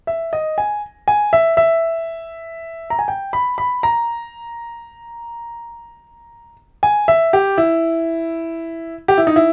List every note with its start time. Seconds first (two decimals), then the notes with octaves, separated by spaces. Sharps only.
0.07 E5
0.33 D#5
0.58 G#5
1.08 G#5
1.33 E5
1.57 E5
2.90 A#5
2.99 G#5
3.08 G5
3.33 B5
3.58 B5
3.83 A#5
6.83 G#5
7.08 E5
7.33 G4
7.58 E4
9.08 G4
9.18 E4
9.27 D#4
9.36 E4